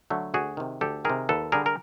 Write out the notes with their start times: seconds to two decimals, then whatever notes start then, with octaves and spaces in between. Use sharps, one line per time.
0.10 D3 F#3 A3
0.34 D2 F#4 G#4
0.57 C3 D#3
0.81 D2 G4 A4
1.05 C3 D#3 G#4 A#4
1.29 D#2 A4 B4
1.52 D3 G3 G#4 A#4
1.66 A#4